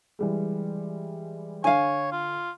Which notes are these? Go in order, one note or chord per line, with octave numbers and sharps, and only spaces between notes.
E3 G3 G#3
D3 C#5 F5 G#5
F4